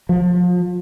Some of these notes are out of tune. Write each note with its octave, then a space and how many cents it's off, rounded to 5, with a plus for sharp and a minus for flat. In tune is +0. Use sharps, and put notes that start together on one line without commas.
F3 +30